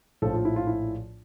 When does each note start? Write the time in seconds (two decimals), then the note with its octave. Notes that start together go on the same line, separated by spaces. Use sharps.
0.22 A#1 A2 F3 A4
0.33 F4
0.45 E4
0.56 F4
0.67 E4